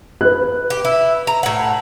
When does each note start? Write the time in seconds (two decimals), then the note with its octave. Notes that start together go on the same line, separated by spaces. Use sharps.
0.21 B4 F#6
0.70 G4
0.85 E4
1.27 A#5
1.43 A2 F#5